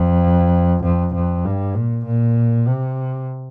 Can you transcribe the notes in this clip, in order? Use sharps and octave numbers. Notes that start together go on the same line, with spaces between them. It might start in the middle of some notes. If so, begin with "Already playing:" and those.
Already playing: F2
F2
F2
G2
A#2
A#2
C3